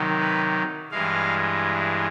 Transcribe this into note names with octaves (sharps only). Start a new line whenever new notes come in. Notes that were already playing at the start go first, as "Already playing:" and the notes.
Already playing: C3 D#3 F#3
B4
G2 E3 G#3 F5